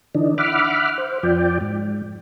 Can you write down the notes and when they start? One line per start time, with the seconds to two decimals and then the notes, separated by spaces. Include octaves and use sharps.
0.15 D3 E3 D4 D#4
0.38 E5 F#5 B5 D6 F6
0.98 C5
1.23 F2 F3 D5 G5
1.61 G#2